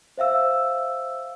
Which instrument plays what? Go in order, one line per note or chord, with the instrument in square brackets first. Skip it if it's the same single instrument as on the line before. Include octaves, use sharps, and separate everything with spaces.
[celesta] C5 E5 F5 E6